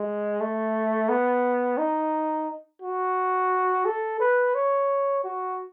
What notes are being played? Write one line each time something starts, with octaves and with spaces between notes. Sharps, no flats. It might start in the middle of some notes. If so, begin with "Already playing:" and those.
Already playing: G#3
A3
B3
D#4
F#4
A4
B4
C#5
F#4